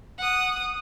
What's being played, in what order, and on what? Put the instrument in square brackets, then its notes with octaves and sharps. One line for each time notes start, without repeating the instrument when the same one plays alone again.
[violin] F#5 D#6